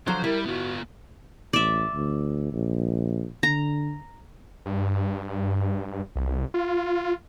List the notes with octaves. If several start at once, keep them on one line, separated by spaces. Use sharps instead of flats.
D3 F3 F#3 C5
G3 E4 A#4
B3 F4 F#4
A1 D5 E5
D2
A#1
D3 A#5
G2
C2
F4